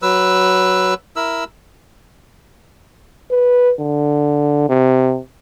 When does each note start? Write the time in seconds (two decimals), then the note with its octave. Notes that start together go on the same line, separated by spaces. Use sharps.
0.02 F#3 B4 E6
1.16 E4 A#4 E6
3.31 B4
3.79 D3
4.69 C3